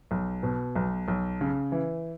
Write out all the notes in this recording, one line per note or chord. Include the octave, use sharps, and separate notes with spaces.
B1
B2
B1
B1
C#3
E3